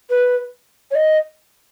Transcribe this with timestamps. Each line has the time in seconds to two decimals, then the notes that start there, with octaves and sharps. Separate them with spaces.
0.10 B4
0.91 C#5
0.95 D#5